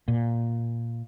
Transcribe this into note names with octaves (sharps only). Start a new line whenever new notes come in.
A#2